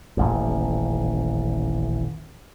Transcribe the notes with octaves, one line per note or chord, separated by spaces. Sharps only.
D#1 A1 F2